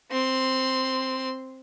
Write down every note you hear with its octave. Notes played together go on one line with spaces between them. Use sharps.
C4 C6